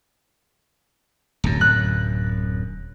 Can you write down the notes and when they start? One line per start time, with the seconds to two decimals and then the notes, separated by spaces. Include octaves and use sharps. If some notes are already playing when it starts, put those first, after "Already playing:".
1.44 D1 F#2
1.61 F#6